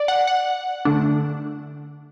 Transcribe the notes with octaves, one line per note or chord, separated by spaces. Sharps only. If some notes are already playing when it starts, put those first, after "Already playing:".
Already playing: D5
F#5
F#5
D3 A3 D4